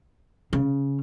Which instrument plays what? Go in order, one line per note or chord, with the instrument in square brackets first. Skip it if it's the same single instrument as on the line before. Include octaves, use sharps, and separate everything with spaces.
[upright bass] C#3